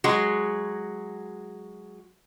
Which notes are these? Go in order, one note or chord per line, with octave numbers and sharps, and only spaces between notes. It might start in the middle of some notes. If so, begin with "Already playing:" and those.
F#3 G#3 F#4